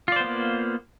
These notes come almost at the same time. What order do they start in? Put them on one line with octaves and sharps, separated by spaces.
F4 D5 C5 B3 A#3